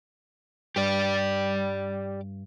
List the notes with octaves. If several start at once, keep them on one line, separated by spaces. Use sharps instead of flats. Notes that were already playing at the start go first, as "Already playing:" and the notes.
G2 G4 D5